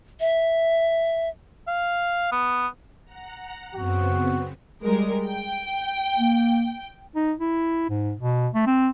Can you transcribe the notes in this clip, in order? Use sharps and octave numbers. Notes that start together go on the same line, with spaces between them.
E5
F5
B3
F#5 A#5
F#2 C#3 B3 C4 F#4
G3 G#3 A#4
G5
A#3
D#4
E4
G#2
B2
A3
C4